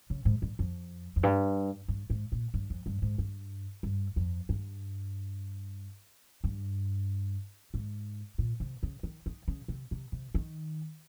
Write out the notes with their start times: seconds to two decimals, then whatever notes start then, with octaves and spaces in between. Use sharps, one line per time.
0.10 C#3
0.25 G#2
0.42 G2
0.59 F2
1.16 F2
1.23 G2
1.88 G2
2.10 G#2
2.32 A#2
2.54 G2
2.70 F2
2.86 G2
3.02 G#2
3.18 G2
3.83 G2
4.16 F2
4.49 G2
6.44 G2
7.74 G#2
8.38 A#2
8.60 C3
8.83 C#3
9.03 D#3
9.26 D#3
9.48 C#3
9.68 C3
9.91 C3
10.12 C3
10.35 D#3